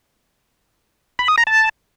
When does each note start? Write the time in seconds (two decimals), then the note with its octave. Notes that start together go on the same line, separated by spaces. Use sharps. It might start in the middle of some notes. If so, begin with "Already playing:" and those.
1.19 B5
1.28 D#6
1.38 A#5
1.47 A5